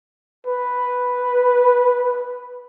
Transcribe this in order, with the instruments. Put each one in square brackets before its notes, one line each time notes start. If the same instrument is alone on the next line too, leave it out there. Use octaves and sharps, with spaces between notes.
[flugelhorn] B4